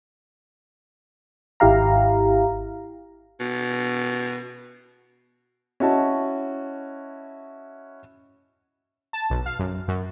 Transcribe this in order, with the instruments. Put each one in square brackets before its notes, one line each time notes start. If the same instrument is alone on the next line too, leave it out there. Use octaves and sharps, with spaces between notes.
[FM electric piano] G#1 E4 G4 F5 A#5
[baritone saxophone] B2
[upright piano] C#4 E4 F#4 D#5 A5
[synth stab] A5
B1
F5
F#2
F#2